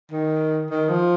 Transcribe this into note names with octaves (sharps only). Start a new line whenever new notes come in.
D#3
D#3
F3